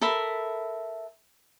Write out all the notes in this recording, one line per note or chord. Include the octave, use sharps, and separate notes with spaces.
A4 A#4 E5 B5